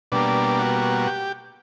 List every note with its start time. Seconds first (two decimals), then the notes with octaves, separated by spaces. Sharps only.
0.12 B2 G3 A#3 D4
0.59 F#4
1.07 G4